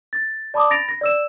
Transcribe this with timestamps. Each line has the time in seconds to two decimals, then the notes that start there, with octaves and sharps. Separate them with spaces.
0.13 A6
0.54 D5 A5 B5 D6 D#6
0.70 B5 A6 A#6 D7 F7
0.89 A#6
1.01 D5 E6 E7